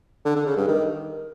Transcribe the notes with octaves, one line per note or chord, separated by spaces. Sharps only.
D3
D3
C#3
G2
D#3